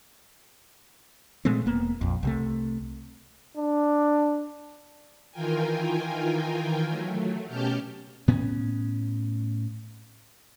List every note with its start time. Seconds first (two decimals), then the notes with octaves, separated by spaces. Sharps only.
1.45 A#2 G#3 A3 C4
1.66 E1 A#3 B3
2.01 A#1 F2
2.23 C2 C3 A3
3.58 D4
5.32 D#3 E3 F4 A#4 G5 G#5
6.88 F#3 A3
7.48 B2 C#4 G4 A5 F6 G6
8.28 A2 B3 C#4